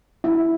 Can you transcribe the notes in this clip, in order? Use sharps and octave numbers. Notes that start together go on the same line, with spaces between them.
E4